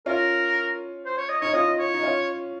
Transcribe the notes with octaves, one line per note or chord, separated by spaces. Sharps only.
C#4 F4 A#4
C5
C#5
D#5
D#4 C#5
C#4 F4 D#5
C#5
D#4
C#4 F4